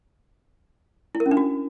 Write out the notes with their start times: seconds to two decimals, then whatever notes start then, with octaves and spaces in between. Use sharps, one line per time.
1.15 E4
1.20 A#4
1.26 C#4
1.31 D4
1.37 F#4